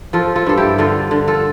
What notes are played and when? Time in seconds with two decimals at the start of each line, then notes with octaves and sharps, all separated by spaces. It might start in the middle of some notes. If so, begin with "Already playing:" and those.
0.13 F3 F4 A4
0.36 F4 A4
0.47 G2 A4
0.57 E4 G4
0.78 D3 F4 A4
1.11 D3
1.27 F4 A4